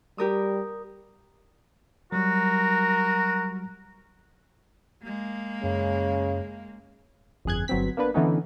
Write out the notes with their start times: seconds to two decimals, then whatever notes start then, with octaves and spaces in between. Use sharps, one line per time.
0.18 G3 G4 A#4 D#6
2.12 F#3 G3 F#4 A#4
5.03 G#3 A#3
5.64 F#2 C#3
7.45 G1 F2 G#4 F#6 G#6
7.68 G1 F#3 B3 C4 B6
7.97 A#3 B3 D4 B4
8.14 D3 E3 A3 B3 C#4 D#4